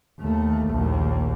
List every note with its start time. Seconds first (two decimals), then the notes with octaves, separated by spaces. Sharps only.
0.19 D#2 A3
0.69 A#1 D#2